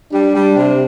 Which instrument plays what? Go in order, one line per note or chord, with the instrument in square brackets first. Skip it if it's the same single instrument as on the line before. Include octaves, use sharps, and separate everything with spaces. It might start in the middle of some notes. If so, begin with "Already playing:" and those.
[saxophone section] G3 [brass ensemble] D4
[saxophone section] G3
C3